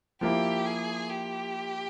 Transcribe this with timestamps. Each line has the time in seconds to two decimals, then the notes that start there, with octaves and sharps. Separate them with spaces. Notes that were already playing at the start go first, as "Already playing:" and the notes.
0.21 F3 A#3 E4 G4
0.65 G#4
1.09 G4